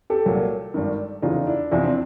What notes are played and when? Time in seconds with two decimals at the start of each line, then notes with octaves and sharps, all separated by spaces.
0.10 G4 A4
0.26 C2 A#2 F#3
0.74 G#1 G2 D#3
1.22 F1 E2 C#3 E3 D#4 F4
1.47 D4 E4
1.71 E2 C3 F3 D4 E4
1.83 C4 D4